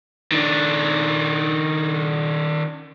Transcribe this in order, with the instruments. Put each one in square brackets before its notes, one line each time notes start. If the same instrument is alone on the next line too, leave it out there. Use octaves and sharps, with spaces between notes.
[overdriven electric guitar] D#3 D4